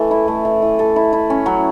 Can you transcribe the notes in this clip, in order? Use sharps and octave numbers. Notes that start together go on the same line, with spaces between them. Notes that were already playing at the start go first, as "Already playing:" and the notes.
Already playing: E3 A3
E4
A3
E3
E3
A4
E4
E4
C#4
F#3